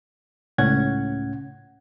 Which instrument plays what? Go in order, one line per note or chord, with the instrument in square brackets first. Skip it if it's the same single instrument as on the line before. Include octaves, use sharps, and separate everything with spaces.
[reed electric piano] C#2 A2 C#4 F#5 G#6